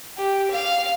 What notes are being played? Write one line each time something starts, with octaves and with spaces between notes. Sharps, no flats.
G4
F5